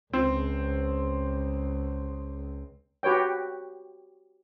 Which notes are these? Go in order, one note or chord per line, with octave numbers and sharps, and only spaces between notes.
C#2 C4
F#4 G4 B4 C#5 G5